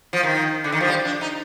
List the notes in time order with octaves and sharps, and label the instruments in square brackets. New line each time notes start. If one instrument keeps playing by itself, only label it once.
[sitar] F3
D#3
D3
D#3
F3
G3
D4
D#4